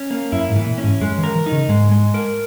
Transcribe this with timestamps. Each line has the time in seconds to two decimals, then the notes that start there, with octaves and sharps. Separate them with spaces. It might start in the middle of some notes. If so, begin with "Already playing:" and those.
Already playing: C#4
0.10 A#3
0.32 F#2 E4
0.50 G#2
0.56 E3
0.67 A#2
0.78 C#4
0.84 G#2
1.00 F#2 G#3
1.18 E3
1.23 A#4
1.35 E3
1.46 D#4
1.52 C#3
1.69 G#2 G#3
1.91 G#3
2.14 A#4